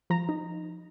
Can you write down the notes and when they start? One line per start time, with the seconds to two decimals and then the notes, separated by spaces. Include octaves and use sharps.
0.10 F3 A#5
0.29 D#4